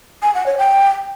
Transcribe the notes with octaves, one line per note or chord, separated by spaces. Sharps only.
G#5
F#5
C#5
G5